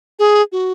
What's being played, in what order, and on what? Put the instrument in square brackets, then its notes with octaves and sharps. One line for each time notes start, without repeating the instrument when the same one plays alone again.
[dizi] G#4
F#4